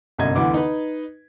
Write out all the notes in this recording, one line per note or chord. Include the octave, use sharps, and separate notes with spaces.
G1 C2 F#2 D#5 G#6
D2 D3 E3 B3 D6
D#4 B4